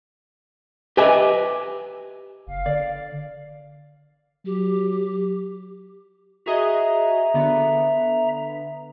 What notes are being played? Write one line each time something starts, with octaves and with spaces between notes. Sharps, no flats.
G4 B4 D#5 E5 G#5
F#1 F5
D3 D5
F#3 G4
F#4 G#4 D#5 E5 A#5
D3 B3